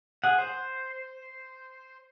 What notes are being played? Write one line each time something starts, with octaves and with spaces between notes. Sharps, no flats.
G#4 F#5
C5